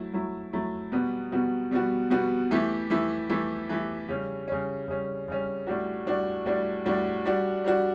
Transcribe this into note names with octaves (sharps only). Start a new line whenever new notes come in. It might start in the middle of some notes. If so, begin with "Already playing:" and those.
Already playing: F#3 A3 E4
F#3 A3 E4
F#3 A3 E4
B2 G3 B3 F#4
B2 G3 B3 F#4
B2 G3 B3 F#4
B2 G3 B3 F#4
E3 A3 E4 G4
E3 A3 E4 G4
E3 A3 E4 G4
E3 A3 E4 G4
C#3 G3 C#4
C#3 G3 C#4
C#3 G3 C#4
C#3 G3 C#4
A2 G3 D4 F#4
A2 G3 D4 F#4
A2 G3 D4 F#4
A2 G3 D4 F#4
G3 D4 F#4
G3 D4 F#4